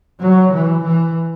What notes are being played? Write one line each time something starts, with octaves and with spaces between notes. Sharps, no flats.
F#3
E3
E3